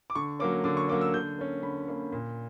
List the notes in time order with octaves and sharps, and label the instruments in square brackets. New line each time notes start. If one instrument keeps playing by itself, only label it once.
[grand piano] D6
D3 C#6
F#3 A#3 C#4 D6
D3 D6
C#6
F#3 A#3 C#4 D6
E6
D3 G6
A#3 C#4
D3 B5
A#3 C#4
A#2